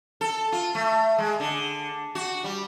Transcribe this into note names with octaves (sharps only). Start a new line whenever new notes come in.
A4
F4
A3
G#3
D3
F#4
G3